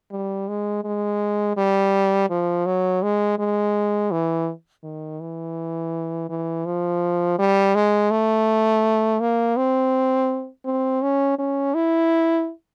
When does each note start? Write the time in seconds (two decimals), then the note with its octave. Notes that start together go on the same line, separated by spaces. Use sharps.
0.12 G3
0.48 G#3
0.84 G#3
1.57 G3
2.30 F3
2.66 F#3
3.03 G#3
3.39 G#3
4.11 E3
4.84 D#3
5.21 E3
6.29 E3
6.66 F3
7.39 G3
7.75 G#3
8.11 A3
9.20 A#3
9.57 C4
10.65 C4
11.02 C#4
11.38 C#4
11.74 E4